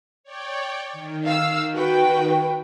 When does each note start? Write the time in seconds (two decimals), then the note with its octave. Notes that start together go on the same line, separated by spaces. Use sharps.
0.24 C#5 D5 G5
0.93 D#3
1.24 F5 E6
1.73 F#4 B4 G5